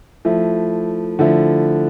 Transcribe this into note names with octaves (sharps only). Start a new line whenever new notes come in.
F3 A3 E4
D3 F3 A3 E4